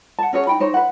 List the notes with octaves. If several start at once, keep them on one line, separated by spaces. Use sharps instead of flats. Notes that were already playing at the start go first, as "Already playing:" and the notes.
F#5 A5
C#4 F#4 G#4 C#5
D#4 G5 B5
D#4 C5 C#5
B4 F#5